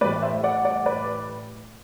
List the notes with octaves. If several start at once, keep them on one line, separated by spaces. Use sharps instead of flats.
A2 E3 G3 B4 D5
C5 E5
D5 F#5
D5 F#5
B4 D5